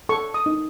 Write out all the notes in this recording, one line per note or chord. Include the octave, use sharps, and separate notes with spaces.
A4 C#6
D#6
D#4